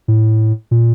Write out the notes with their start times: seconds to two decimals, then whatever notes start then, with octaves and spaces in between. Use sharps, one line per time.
0.08 A2
0.71 A#2